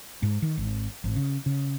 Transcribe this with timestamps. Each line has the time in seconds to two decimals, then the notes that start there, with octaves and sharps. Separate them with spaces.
0.23 G#2
0.42 D#3
0.57 G#1
1.04 G#1
1.16 C#3
1.46 C#3